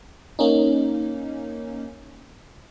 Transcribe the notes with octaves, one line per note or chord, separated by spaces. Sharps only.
A#3 C#4 D#4